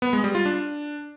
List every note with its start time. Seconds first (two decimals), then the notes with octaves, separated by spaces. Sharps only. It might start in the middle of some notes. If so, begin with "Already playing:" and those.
0.02 B3
0.13 G#3
0.24 G3
0.35 F4
0.46 D4